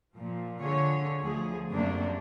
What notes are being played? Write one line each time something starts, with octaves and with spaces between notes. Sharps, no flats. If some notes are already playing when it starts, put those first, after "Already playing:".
A#2 F3
D3 F4 G#4 C#5
D2 F3 G#4
F#2 C3 A3 A#3 D4